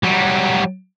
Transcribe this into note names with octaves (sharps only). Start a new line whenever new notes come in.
F#3 G3